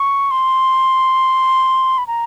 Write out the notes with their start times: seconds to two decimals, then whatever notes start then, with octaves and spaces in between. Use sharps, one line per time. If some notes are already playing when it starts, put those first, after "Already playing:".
Already playing: C#6
0.31 C6
1.98 B5
2.07 A#5